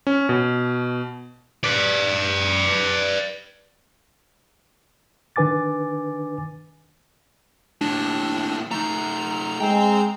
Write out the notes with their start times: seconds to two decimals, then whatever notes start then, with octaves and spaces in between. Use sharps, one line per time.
0.07 C#4
0.29 B2
1.64 B4 D5
5.36 D#3 D4 B4 G#5 D6 A6
7.81 D#2 A2 D4
8.71 A3 D#4 A#5
9.60 G#3 C5 G5